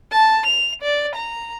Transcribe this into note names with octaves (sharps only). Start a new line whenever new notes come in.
A5
F7
D5
A#5